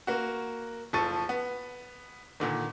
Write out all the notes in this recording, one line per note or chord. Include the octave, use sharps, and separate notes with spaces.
A#3 F#4
F#1 F3 A4 C#6 A6 D#7
B3
A#2 D3 D#3